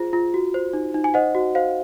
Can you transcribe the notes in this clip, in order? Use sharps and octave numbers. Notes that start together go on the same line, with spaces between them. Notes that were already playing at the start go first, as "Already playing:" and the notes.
Already playing: F4 G#4 C5
F4
F#4
C5
D#4
D#4
G#5
C5 D#5 F#5
F#4
C5 F5